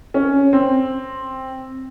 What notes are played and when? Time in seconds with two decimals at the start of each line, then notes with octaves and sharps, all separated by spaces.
0.14 C#4
0.53 C4